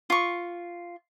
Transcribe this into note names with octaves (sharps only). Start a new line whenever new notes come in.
F4 C#6